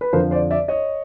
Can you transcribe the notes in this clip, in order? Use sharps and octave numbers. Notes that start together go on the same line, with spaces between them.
B4
F2 D3 F3 A#4 C5
C5 D5
D5 E5
C#5 D#5